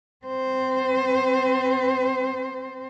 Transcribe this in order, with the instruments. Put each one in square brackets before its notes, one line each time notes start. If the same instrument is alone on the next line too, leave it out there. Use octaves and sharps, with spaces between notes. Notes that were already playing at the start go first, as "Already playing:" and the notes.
[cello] C4 C5